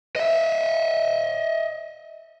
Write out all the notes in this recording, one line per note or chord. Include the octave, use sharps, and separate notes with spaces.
D#5 E5